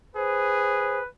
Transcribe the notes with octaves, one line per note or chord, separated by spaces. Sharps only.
G#4 B4 C5